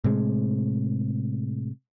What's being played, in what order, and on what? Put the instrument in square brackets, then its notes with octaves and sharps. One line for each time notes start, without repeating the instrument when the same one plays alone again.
[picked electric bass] A2 C3 G#3